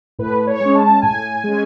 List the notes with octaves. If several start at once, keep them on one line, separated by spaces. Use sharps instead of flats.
A2 B4
C#5
G#3 C#4
A5
A2 G#5
G#3 C#4